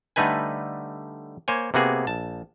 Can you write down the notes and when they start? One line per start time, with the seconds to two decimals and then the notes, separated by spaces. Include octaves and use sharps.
0.16 D3 G3 A3 D#4 B4 G#5
1.48 A#3 C5 C#5 G#5
1.74 C3 A#3 B3 F#4 G#4
2.07 A#1 A5